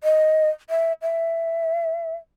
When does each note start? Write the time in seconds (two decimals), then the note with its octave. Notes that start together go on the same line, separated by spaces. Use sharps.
0.04 D#5
0.70 E5
1.02 E5